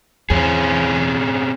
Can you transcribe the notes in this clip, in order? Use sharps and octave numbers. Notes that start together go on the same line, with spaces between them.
E2 C4 C#4 G#4